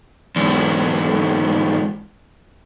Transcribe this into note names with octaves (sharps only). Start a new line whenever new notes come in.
E2 G#2